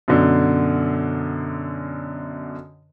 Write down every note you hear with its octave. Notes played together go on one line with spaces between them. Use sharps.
F#2 B2 D3